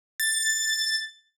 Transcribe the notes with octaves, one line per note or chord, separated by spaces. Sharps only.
A6